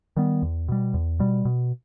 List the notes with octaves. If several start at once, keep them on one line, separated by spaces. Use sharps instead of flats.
D#3 G3 B3
E2
B2 G3
E2
B2 G3
B2